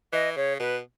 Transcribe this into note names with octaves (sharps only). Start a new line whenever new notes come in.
E3 D#5
C#3 C#5
B2 B4